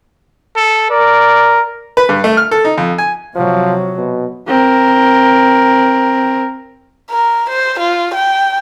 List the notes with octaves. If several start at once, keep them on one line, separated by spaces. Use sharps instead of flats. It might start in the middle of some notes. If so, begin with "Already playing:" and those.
A4
A#4 D5
B4
G2
A3
F6
A4
D#4
F2
G#5
C3 F3 F#3
B2
C4 A#4
A#4
C5
F4
G5